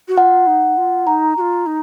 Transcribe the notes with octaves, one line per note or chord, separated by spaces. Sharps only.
F#4
F4 F#5
D#4
F4
D#4 A#5
F#4
F4
D#4